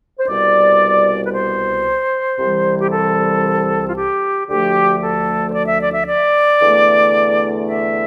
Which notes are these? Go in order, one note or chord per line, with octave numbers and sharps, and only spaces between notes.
C5
C2 B2 G3 D5
B4
C5
C2 C3 E3 G3
G4
A4
F4
G4
D2 D3 F3 A3 G4
A4
C5
D5
E5
D5
E5
D5
E2 D3 A3
E5